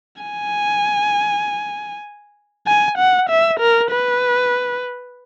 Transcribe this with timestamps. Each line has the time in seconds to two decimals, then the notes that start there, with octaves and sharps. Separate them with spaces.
0.22 G#5
2.67 G#5
2.98 F#5
3.29 E5
3.60 A#4
3.91 B4